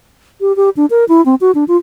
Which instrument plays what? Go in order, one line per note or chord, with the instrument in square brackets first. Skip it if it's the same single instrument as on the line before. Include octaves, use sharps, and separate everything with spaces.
[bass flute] G4
G4
D4
A#4
E4
C4
F#4
D4
F4